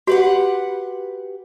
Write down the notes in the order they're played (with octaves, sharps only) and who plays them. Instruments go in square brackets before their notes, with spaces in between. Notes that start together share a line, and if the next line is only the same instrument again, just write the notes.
[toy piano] F#4 [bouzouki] G4 B4 F#5